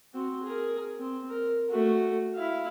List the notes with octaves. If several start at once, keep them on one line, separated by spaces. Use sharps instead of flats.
C4 F#4
G#4 A#4
C4
A#4
A3 F#4
E4 F5